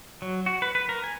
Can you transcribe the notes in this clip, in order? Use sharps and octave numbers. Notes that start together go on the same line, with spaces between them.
F#3
F#4
B4
B4
A#4
G#5